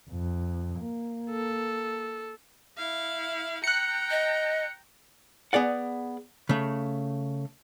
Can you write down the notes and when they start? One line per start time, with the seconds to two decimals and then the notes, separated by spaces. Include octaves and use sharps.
0.11 F2
0.80 A#3
1.30 A4
2.78 E4 F5
3.64 G5 A#5 F#6 C#7
4.11 D#5
5.53 B3 G#4 D5 F#5
6.49 C#3 A3